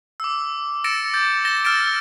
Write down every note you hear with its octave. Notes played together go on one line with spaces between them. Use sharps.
D6 E6
E6 A6 A#6 C#7 D7 E7
D6 G6 A6
A6 A#6 E7 G7
E6 F6 A6 A#6 D7 E7